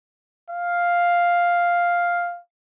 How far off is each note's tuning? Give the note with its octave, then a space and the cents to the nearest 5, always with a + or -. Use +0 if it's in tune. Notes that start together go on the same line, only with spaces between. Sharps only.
F5 +0